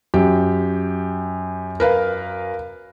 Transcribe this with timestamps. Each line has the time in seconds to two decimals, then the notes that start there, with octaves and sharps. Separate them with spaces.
0.14 F#2 G4
1.80 A#4 B4 F5